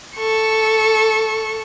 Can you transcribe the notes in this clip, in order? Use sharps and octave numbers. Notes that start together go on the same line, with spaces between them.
A4 C#6